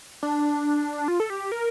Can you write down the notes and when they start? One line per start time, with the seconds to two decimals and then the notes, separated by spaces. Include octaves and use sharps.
0.23 D4
1.08 F4
1.20 A4
1.30 G4
1.52 A#4